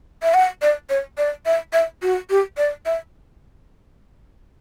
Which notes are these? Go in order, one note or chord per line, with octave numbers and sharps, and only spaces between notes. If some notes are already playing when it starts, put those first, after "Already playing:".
E5
F#5
D5
C#5
D5
E5
E5
F#4
G4
D5
E5